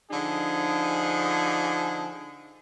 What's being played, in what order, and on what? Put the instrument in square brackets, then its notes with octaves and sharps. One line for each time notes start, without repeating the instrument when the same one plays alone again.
[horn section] D3 F3 D4 D#4 G#4